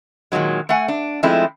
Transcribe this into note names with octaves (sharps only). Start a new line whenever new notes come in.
A#2 D#3 F3 F#3 G#3
A3 F#5 G#5
D4
F3 G#3 A3 C4 E4